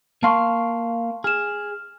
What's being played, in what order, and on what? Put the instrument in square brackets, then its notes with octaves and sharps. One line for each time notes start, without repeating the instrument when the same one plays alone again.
[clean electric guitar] A#3 F5 [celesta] A5 C6 C#6
[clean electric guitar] G#4 [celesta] F6 E7